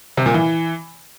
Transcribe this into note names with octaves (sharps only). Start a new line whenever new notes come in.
C3
A#2
E3